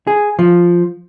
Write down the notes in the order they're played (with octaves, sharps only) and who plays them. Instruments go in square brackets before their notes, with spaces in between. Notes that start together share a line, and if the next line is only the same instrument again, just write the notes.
[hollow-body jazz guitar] G#4
F3